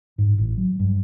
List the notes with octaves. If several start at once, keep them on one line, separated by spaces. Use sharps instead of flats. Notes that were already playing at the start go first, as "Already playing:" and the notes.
G#2
A1
F#3
G2